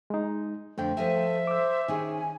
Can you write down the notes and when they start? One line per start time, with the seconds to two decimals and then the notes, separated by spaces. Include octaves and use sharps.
0.10 G#3 D#4
0.78 F2 D3 A3 D4 G5
0.97 F3 A4 D#5 E5 G#5
1.47 C5 D6 E6
1.88 D#3 C#4 G#4 G#5